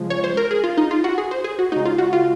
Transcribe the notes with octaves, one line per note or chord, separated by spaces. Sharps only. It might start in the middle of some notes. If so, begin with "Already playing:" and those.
Already playing: C#3 F3 G#3
C#5
C5
A#4
G#4
F4
D#4
F4
F#4
G#4
C5
G#4
F#4
C#3 G#3 D#4
F4
F#4
F4